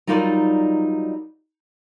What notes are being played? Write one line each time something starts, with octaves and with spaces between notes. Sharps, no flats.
F#3 G3 D#4 F4 A#4 D5